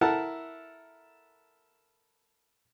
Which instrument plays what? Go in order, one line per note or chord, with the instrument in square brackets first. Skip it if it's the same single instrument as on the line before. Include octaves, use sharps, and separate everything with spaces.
[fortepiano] E4 A4 A#4 F#5 A5